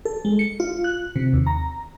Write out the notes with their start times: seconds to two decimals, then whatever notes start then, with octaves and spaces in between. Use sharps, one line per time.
0.05 A4
0.25 G#3
0.39 C#7
0.60 F4
0.84 F#6
1.16 C3
1.33 D#2
1.47 A#5